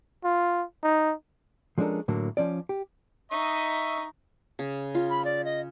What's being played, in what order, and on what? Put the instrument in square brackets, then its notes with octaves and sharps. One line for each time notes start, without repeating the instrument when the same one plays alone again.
[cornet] F4
D#4
[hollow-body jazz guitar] F3 G#3 C#4 D4 A4 A#4
A2 D3 F#3 A#3
F3 C#4 D5
G4
[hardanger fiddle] D#4 [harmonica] D#5 E5 C#6
[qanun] C#3
F4
[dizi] B5
D5
D#5